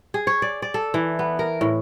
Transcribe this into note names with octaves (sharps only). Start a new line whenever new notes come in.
G#4
C#5
D5
D5
A4
E3
B3
A#4
A2